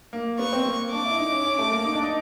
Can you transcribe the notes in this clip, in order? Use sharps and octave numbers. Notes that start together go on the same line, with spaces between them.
A#3
B3 C#6
C4
A#3
A#3
D4 D6
E4
D#4
C#4
C#4
A3
A#3
D#4
D4
D#4